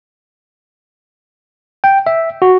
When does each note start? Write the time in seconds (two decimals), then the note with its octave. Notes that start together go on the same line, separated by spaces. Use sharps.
1.84 G5
2.07 E5
2.42 F#4